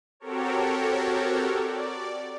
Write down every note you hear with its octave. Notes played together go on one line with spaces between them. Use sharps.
C4 F#4 G4 A4 A#4 C#5
D5